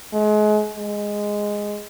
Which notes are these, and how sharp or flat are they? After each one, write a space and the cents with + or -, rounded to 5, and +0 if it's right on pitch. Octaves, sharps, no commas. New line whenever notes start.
G#3 +35
G#3 -5